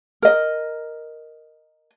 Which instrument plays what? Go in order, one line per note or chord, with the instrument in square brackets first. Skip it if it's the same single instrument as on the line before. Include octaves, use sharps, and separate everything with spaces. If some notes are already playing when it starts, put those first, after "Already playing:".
[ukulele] A#4 D#5